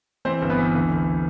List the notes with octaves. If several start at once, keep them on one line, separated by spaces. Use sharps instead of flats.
E3 C4 C5
G1
B3 B4
E3
D2
D2